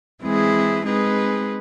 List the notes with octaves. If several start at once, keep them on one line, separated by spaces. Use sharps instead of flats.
E3 G#3 C4 E4 G#4
G#3 C4 D#4 G#4 B4